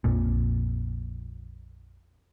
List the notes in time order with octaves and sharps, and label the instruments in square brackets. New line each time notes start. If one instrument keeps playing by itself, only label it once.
[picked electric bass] A#1 F2 A#2